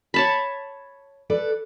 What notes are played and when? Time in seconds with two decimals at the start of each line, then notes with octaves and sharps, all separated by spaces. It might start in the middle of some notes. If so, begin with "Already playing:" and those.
0.14 C#5 A5 B5
1.30 A4 B4 D5